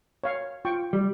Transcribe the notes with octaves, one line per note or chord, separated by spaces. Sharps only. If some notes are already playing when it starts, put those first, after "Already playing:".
C#5 F5
F4 G5 C#6
G3